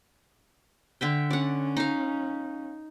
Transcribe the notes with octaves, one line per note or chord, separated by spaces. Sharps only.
D3 E5 G5
C#4 D5 F#5
D#4 F5